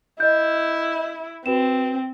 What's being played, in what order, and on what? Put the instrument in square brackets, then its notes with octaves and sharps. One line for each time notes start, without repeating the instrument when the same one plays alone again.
[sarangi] E4 [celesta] D#5 G6
[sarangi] C4 [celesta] F#4 B4 E7